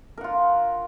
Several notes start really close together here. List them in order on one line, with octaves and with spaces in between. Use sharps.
A#4 F#5 F4